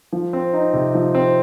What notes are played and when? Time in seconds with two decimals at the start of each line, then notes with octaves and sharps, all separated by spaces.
0.13 F3
0.33 C4
0.53 D#4
0.74 C3
0.95 F3
1.15 C4